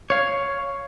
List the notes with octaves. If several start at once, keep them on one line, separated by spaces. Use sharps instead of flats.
C#5 F5